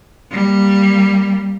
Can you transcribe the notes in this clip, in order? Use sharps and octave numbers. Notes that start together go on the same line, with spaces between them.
G3 A#3